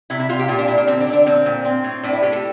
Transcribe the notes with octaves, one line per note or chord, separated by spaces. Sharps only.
C3 E4
E4
C3 F4
G4
A#2 F4
D4
A#2 E4
D4
D3 C4
D4
D3
D4
A#2 C4
A#2
C4
A2
A2 D4
E4
A2 G4
A4